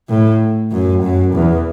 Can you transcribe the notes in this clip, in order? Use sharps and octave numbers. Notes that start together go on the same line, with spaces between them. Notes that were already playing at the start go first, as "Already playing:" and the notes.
A2
F#2
F#2
E2